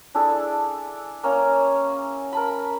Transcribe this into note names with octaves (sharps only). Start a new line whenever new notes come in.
D4 E4 G#4 A4
A#3 C#4 A#5
A#4 A5 B5